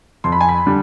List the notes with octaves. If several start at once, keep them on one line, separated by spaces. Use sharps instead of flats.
F2 C6
B5
G#5
B5
D3 G3